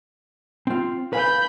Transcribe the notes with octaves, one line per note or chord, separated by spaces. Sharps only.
C4 F4
B4 F5 G#5 B5 G6